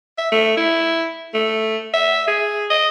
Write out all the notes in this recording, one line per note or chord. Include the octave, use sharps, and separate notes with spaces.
E5
A3
E4
A3
E5
G#4
D#5